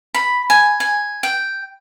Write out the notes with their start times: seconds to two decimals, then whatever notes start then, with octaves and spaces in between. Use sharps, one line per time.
0.15 B5
0.50 G#5
0.80 G#5
1.23 G5